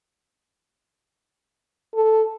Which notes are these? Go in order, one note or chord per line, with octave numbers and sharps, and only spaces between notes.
A4